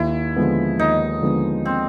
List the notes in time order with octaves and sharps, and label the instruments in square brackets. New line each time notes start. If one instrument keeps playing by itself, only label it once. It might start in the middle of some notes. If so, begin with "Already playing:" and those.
Already playing: [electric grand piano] D#2 [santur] E4
[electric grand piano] D3 F3 G#3 B3
[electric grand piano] D#2 [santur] D#4
[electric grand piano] D3 F3 G#3 B3
[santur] C4